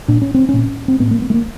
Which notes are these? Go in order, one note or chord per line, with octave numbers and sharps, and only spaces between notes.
A#2 D4
C#4
C4
C#4
A#2
C4
A2 B3
A#3
B3
A3
A#3